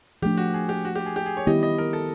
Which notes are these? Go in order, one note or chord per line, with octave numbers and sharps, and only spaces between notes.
F3 A3 D4 G4
F#4
G#4
G4
F#4
G4
G#4
G4
G#4
C#5
D#3 G3 B3 E4 G4 D#5
D#5
A#4
A4